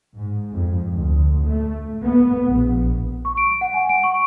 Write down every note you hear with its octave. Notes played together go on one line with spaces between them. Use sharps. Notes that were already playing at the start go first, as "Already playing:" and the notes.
G#2
F2
D2
A3
B3
A#1
C#6
D7
F#5
G#5
D7
C#6